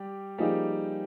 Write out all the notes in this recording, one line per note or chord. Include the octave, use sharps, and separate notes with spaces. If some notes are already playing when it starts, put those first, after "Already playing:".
Already playing: G3 G4
F3 G3 A#3 D#4 G4 G#4